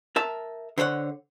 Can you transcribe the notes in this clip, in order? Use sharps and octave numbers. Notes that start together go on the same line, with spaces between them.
A#4 E5 A5
D3 C5 C#5 F#5